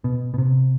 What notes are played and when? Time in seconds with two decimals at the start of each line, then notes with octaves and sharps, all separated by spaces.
0.04 B2
0.34 B2
0.38 C3